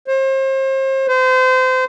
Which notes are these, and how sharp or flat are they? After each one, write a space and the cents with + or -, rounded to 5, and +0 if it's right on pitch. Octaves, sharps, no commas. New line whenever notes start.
C5 +35
C5 -30